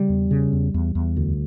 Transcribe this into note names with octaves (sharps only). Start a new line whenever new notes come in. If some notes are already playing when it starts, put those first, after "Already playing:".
Already playing: C#3 G3
E2
C#3
E2
E2
E2
D2